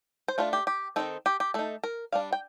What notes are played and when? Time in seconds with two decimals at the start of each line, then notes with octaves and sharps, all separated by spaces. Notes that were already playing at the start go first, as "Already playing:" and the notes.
0.28 C5
0.38 A3 D4 F4
0.53 G4
0.67 G4
0.96 D#3 G3 C4 D#4 A4
1.26 G4
1.40 G4
1.54 A3 D#4 A4
1.83 A#4
2.12 G3 D4 F5
2.32 G5